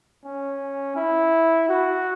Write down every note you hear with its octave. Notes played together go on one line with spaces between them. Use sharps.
C#4
E4
F#4